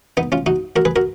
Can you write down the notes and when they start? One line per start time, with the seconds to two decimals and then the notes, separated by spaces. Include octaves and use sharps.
0.17 B3 D#4
0.32 C#4 F4
0.46 D#4 F#4
0.76 F#4 A#4
0.85 G#4 B4
0.96 F#4 A#4